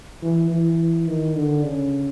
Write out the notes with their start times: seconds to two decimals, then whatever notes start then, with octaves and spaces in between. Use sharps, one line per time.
0.22 E3
0.51 E3
1.07 D#3
1.36 D3
1.64 C#3